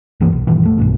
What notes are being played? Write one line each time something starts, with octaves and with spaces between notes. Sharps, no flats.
C#2 G2 E3 A#3
B1
G2 A#2 D#3 E3
F1 A3
B1 G2 B2